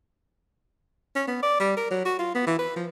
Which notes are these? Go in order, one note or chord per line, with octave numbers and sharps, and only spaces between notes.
C#4
B3
D5
G3
A#4
F#3
F#4
F4
B3
E3
B4
F3